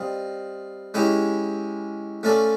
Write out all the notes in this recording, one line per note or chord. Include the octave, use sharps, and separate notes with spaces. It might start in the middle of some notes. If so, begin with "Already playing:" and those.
Already playing: G3 C4 F4 D#5
G#3 C#4 E4 G4
A3 C#4 F4 A4 D5